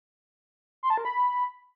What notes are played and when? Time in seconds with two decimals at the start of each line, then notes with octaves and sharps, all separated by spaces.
0.83 C6
0.90 A5
0.97 A#4
1.05 B5